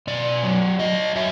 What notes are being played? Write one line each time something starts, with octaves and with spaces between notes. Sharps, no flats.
B2 D5
F#3
F#3 D#5
F#3 E5